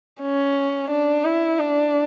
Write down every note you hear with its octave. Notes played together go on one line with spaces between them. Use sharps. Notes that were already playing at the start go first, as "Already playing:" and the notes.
C#4
D4
E4
D4